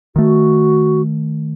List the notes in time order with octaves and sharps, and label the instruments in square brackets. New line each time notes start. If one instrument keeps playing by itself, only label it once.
[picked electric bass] D#3 A3 [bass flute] F#4